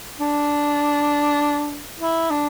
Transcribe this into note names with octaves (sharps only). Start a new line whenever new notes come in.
D4
E4
D4